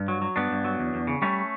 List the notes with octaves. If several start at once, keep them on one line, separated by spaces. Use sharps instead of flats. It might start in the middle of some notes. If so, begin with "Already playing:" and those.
Already playing: G2
F#3
F#3
G2 B3 D4
G2
F#3
E2
E2
C#3
G3 A3 C#4